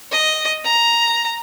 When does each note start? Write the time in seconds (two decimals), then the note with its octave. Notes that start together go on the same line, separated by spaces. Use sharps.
0.12 D#5
0.64 A#5